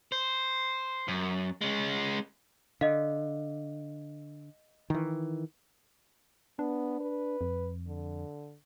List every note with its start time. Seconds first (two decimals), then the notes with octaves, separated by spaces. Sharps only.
0.12 C5
1.08 F#2
1.61 G#3 C#4
2.81 D3 D#5 F5
4.90 D#3 E3
6.59 B3 D4
7.00 B4
7.41 F2
7.87 D3